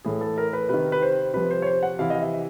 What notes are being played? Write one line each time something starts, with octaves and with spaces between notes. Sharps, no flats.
A2 E3 G#4
A4
A#4
B4
C3 D#3 B4
B4
C5
C3 F3 B4
C5
C#5
C5
F#5
C3 E3 F5
D#5
E5